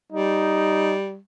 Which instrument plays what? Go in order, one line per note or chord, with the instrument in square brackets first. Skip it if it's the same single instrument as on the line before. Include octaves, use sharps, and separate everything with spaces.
[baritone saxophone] G3 [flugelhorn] D#4